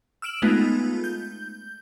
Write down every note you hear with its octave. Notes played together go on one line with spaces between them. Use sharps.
E6 F6 D7 E7 F#7
G#3 A3 B3 D#4 F4
G6